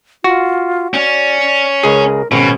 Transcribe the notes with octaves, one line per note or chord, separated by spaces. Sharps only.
F4 F#4
C#4 D5
C#2 G#4 A#4
G#1 B2 C#4